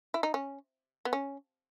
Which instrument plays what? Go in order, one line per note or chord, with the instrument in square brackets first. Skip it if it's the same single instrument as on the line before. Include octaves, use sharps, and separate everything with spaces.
[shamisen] E4
D#4
C#4
B3
C#4